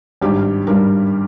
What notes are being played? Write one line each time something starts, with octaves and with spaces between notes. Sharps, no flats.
G#1 G2 G3 G4
G#1 G2 G3 A#4